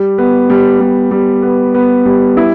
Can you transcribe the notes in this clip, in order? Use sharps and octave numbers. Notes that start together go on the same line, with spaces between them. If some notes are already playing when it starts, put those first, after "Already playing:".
Already playing: G3
B3
G3
G3
G3
B3
B3
G3
E4